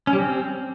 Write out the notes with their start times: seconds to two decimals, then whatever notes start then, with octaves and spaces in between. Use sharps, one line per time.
0.07 C#4
0.13 G3
0.19 C4